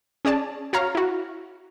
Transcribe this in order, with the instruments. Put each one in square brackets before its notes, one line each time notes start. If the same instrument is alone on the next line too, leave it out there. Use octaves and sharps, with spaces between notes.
[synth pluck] C#4 G#4 D5 A5
F#4 C#5 F5 A#5 F6
E4 F#4